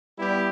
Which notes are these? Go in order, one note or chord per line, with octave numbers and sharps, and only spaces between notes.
G3 B3 E4 G4